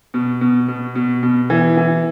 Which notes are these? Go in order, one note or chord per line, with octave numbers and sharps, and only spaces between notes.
B2
B2
B2
B2
B2
E3
E3